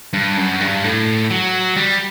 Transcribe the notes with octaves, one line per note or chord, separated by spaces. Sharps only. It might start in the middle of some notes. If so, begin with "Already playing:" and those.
G2
F#2
G2
A2
F#3
G3